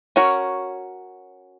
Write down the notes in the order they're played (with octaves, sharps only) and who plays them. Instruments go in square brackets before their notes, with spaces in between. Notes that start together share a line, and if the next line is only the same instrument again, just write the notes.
[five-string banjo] C#4 F#4 A#4 C#5